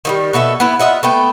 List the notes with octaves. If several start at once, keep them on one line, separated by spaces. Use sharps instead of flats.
D#3 F#3 G3
B2 F#4 A4 E5
B3 E4
F4 D#5 E5 F#5
A3 B3 G5